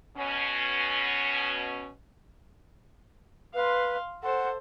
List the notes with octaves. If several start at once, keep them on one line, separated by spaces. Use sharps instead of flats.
B2 C#4
B4 F5 C6
A4 C5 F#5